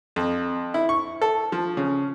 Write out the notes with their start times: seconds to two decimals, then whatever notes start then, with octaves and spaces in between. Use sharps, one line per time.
0.16 F2
0.74 E4
0.89 C#6
1.22 A4
1.52 F3
1.77 C#3